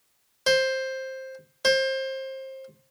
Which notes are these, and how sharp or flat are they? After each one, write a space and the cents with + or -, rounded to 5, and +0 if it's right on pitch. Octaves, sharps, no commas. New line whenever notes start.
C5 +10
C5 +25